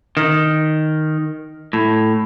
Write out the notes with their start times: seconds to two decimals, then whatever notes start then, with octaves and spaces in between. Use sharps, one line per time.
0.17 D#3
1.73 A2